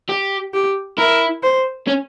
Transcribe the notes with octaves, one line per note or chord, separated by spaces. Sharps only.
G4
G4
E4 A#4
C5
C#4